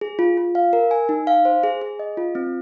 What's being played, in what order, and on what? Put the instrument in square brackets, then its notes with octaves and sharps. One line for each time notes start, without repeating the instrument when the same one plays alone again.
[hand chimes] G#4
F4
F4
F5
A#4
G#5
D#4
F5
C5
G#4
G#4
D#5
F4
C4